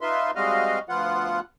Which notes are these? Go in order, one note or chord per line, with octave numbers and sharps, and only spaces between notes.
D#4 F4 B4 E5 C6
G3 G#3 C4 F#4 D#5 F5
D2 F3 B3 F4 F#5